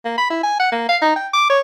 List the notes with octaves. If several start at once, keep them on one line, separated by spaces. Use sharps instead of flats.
A#3
B5
E4
G#5
F#5
A#3
F5
D#4
G5
D6
C#5